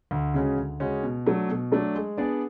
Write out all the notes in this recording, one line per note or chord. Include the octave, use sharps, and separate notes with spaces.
D2
C#3 G#3 C#4 F#4
D2
C#3 G#3 C#4 F#4
B2
F#3 A3 D4
B2
F#3 A3 D4
G#3
B3 D4 G#4 D5